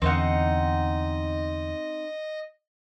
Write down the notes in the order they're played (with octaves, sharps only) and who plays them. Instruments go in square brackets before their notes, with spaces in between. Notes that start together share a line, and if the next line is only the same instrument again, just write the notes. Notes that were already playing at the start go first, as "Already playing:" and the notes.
[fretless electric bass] E2 D3 [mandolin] C4 D#4 F#5 [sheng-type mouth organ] D#5